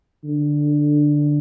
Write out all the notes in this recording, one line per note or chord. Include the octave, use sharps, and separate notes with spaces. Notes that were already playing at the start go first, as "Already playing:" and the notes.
D3